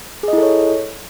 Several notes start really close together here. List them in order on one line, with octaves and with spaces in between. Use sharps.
G#4 D#5 E4 A4 C#5